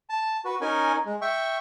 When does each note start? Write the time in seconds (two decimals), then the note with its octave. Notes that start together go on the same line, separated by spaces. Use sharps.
0.09 A5
0.45 F#4 B4
0.61 C#4 D#4 A#4 G#5
1.05 G#3
1.21 E5 G5 C#6